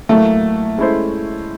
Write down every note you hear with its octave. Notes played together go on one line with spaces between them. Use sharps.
A2 F#3 A3 A#3
G#3 C#4 E4 A4 C5